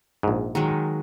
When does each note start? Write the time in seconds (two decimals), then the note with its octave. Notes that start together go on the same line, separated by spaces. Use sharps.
0.23 A#1 G#2
0.55 D#3 F#3 G#3